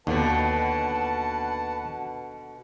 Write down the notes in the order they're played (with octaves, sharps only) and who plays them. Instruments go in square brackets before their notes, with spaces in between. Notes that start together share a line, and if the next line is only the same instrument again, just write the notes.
[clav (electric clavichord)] D#2 [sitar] B2 D3 [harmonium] B4 F#5 A5